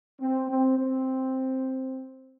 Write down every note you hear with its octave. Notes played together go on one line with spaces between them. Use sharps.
C4
C4
C4